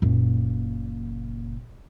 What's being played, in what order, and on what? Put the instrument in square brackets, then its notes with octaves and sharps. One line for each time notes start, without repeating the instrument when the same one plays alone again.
[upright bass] F#1 A#2